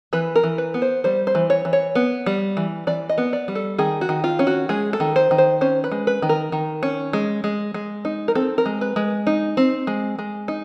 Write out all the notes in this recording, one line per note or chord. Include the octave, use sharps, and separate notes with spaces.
E3 B4
A#4
E3
B4
B3
C5
G3 C5
C5
E3
C#5
E3
C#5
B3
G3
E3
E3 D5
D#5
B3
D5
G3
A4
D#3 G#4
F#4
D#3
F4
C#4
F#4
G#3 G#4
A4
D#3
C5
D#3
C5
C#4 C5
B4
G#3
B4
D#3
A#4
D#3
C#4
G#3
G#3
G#3
D#4
A#4
C4 A4
A#4
G#3
B4
G#3
D#4
C4
G#3
G#3
D#4